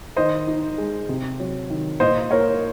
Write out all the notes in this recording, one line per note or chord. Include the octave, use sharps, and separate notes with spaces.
D#3 C5 D#5
D#4
G#3
C3
F#3
D#3
A#2 C5 D#5
A#3 A#4 C#5